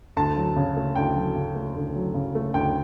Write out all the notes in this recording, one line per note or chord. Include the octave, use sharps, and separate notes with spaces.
D2 A5
F#3
C#3
A3
D2 G5
F#3
C#3
A3
D2
F#3
C#3
A3
D2 G5